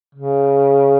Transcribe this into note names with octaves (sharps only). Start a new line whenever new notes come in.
C#3